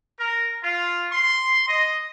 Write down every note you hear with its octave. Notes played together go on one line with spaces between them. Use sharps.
A#4
F4
C6
D#5